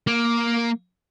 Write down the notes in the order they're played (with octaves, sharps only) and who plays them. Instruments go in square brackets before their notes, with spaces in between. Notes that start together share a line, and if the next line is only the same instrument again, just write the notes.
[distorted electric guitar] A#3